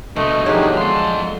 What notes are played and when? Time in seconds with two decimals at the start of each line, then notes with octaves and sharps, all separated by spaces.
0.16 D2 B2 A3 D#5
0.46 F3 F#3 D4 D#4 G4 G#4 C#5
0.77 G#3 A4 F5 C6